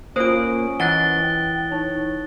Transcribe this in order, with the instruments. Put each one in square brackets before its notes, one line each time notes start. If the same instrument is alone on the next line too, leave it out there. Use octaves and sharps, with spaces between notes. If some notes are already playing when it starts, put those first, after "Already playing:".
[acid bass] A#3 [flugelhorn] C#4 [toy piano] F4 A4 C5 [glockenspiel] D#6 D7
[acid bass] E3 [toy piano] E4 D#5 F#5 [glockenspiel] F#6 A6 G7
[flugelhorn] G5
[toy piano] D#4 [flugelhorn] C#5